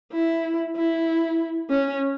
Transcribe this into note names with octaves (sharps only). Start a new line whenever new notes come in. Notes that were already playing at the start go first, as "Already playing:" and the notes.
E4
E4
C#4